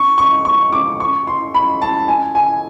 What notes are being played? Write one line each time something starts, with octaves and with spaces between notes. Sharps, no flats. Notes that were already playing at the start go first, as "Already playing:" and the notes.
Already playing: C#6
C#6
C#6
D6
C#6
C6
B5
A5
G#5
G#5